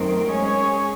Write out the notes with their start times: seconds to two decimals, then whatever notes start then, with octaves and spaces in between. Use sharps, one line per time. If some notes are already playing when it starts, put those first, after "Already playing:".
Already playing: F#2 D#3 A3 C4 D#4
0.27 G#3 C#4 G#4 C#5